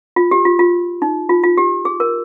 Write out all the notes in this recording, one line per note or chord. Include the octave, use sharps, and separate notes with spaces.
F4
G4
F4
F4
D#4
F4
F4
G4
G#4
A#4